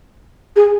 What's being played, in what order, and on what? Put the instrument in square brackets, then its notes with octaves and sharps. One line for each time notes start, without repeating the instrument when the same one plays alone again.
[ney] G#4